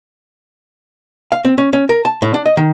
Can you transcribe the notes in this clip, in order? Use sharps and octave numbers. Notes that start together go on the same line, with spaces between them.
F5
C4
C#4
C#4
A#4
A5
A2
D4
D#5
D#3